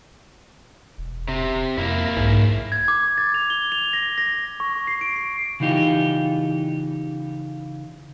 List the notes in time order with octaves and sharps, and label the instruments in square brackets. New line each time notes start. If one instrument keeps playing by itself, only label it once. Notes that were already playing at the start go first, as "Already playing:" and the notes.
[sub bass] E1
[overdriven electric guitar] C3
[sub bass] F2 [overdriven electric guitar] A#3 E4 [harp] E5
[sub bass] B1 [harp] G#2
[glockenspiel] G#6
D6
A6
F7
G7
F7
A#6
A#6
C#6
C7
D7
C7
[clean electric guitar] C#3 E3 D#4 F4 G4